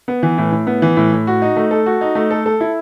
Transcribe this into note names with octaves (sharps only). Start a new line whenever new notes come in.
B3
E3
A2
A2
B3
E3
A2
A2
F#4
D#4
A3
A4
F#4
D#4
A3
A4
A4
E4